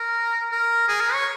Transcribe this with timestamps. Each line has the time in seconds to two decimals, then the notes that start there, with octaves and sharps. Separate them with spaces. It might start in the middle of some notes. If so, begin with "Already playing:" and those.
Already playing: A#4
0.52 A#4
0.88 G#4
1.01 A#4
1.13 C#5